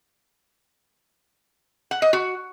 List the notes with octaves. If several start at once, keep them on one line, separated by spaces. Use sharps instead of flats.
F#5
D#5
F#4